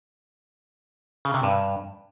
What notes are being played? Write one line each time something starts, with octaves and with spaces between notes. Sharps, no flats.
C#3
C3
G2